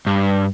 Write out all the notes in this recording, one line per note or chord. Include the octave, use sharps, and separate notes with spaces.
G2